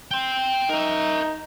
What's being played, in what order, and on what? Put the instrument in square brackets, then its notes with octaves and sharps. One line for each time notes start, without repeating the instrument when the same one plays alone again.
[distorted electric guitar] G5 C6
[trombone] D#4 [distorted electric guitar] A#4 E5